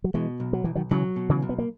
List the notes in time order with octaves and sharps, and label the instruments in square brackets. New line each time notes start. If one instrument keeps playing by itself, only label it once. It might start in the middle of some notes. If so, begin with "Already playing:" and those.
[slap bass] F#3
[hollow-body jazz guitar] B2 [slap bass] E3 G#3
[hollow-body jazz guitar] B1
[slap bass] F#3
[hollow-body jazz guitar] B1 [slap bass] E3
[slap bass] D#3 F#3
[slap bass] C#3 E3 [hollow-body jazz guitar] F#3
[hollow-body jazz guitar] B2
[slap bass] C#3 E3
[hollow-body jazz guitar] B1
[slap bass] B3
A#3